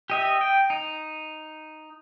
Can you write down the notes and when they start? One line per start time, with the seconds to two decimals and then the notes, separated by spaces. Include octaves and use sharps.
0.10 G4 D#5 E5
0.41 G5
0.70 D#4